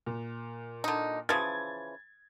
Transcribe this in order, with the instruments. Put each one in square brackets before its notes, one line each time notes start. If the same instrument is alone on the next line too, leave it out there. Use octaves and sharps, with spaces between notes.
[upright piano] A#2
[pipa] D3 D#4
[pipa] C#3 E3 F3 [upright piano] G#6 A6